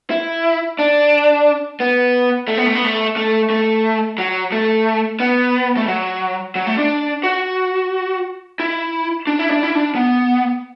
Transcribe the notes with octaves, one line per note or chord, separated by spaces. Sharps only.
E4
D4
B3
A3
B3
A3
B3
A3
A3
A3
F#3
A3
B3
A3
F#3
F#3
A3
D4
F#4
E4
D4
E4
D4
E4
D4
B3